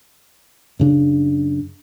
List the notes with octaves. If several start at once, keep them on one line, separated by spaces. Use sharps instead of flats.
F#2 C#3 D4